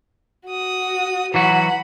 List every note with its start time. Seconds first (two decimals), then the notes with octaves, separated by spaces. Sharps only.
0.46 F#4 D#6
1.34 E3 F#3 F#4 F#5 B5